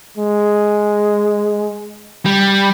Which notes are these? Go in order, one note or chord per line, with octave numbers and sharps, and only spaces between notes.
G#3
G3